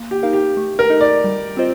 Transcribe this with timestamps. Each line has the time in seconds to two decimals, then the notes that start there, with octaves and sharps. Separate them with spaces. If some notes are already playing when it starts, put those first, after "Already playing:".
Already playing: A#3
0.11 G4
0.23 D#4 A#4 F5
0.33 G4
0.57 A3
0.79 A#4
0.90 D#4 A4 D#5
1.01 D5
1.24 G3
1.57 C4 F4 C5 D#5